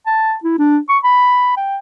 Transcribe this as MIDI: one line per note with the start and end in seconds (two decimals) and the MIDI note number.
0.06 0.34 81
0.44 0.55 64
0.59 0.78 62
0.89 0.98 85
1.04 1.56 83
1.57 1.78 79